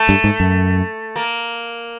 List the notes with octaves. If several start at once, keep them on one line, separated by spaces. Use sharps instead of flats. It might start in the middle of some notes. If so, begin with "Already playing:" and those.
Already playing: A3
G2
G#2
F#2
A#3